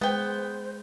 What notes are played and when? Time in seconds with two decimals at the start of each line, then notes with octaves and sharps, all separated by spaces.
0.01 G#3 B3 C5 G5